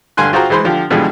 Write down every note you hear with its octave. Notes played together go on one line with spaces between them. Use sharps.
G2 D3 F5 G#5 C6 F#6
F4 F#4 G#4 C5 G5 A#5
E3 G#3 C5 B5 C6
D3 F3 G4
B2 D3 E3 F3 G3 G#3